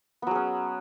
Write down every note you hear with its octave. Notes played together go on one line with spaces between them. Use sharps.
F#3 B3 C#4 G#4